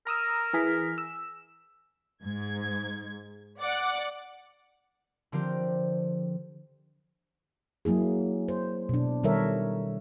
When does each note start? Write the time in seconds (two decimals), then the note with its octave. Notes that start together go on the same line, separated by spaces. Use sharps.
0.07 A#4 A#5 D#6 E6
0.54 E3 G#4 B6
0.98 E6
2.24 G#2 G#6
3.60 D5 F#5 D6
5.32 D3 F3 C4 G4 A#4
7.85 F#3 A#3 E4 G#4
8.48 C5
8.89 B2 D4
9.23 D#3 G3 A4 A#4 C#5 E5